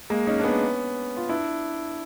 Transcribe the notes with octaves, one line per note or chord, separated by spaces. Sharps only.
G#3 A#3
C#4 D#4
D4
B3 C#4
F4
D4 E4